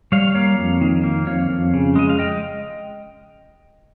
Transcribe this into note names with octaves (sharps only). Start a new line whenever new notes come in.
G3 C#5 F5
A#3 C#5 F5
F2
D#3
A#3
F2 C#5 F5
F2
C#3
G#3 D#5
F5
D#5 G5